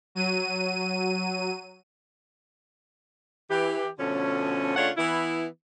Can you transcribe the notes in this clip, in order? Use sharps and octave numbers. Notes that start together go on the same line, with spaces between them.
F#3 D#7
E3 G4
B2 D3 F3 A3 C#4
C#3 A3 D4 F4 C#5 F#5
E3 B3 E4